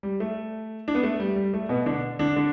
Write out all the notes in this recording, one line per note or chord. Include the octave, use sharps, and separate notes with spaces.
G3
A3
D4
B3
A3
G3
G3
A3
B2 B3
D3 D4
D3 D4
D3 D4